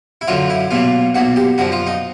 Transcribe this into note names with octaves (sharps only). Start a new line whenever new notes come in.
E4
F#2 D3 F#3 F4
E4
B1 A#2 F#3 F4
B1 A#2 F#3 F#4
G4
F#2 D3 F3 F#4
F4
D#4